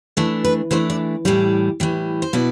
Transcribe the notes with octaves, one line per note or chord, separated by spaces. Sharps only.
E3 A3 D4 A4
B4
E3 A3 D4 C5
D5
A2 E3 G3 D5
A2 E3 G3
C5
B2 B3 E4 D5